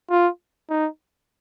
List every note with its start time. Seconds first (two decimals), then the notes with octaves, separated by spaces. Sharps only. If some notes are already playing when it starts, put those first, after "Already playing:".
0.10 F4
0.69 D#4